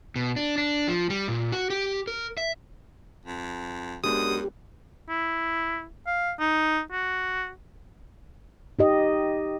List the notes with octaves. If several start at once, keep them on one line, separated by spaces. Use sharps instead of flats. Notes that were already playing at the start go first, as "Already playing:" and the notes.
B2
D4
D4
F3
G3
A#2
F#4
G4
A#4
E5
F2
F#2 G#3 B3 D4 G4 D#6
E4
F5
D#4
F#4
D#4 G4 D#5